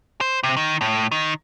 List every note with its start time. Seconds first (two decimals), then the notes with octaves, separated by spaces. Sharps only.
0.21 C5
0.43 C3
0.57 D#3
0.81 A2
1.12 D#3